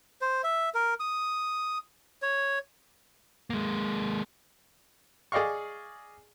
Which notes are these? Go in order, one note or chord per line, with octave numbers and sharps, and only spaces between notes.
C5
E5
A#4
D#6
C#5
G#3 A#3
G#4 D5 D#5 F5 C#6